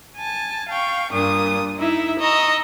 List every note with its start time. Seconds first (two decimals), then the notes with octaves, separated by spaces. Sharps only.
0.18 G#5 A5
0.69 F5 G5 C#6
1.13 G2 A#2 D4 D#6
1.78 D#4 E4 E5
2.19 D#5 A#5 C#6 E6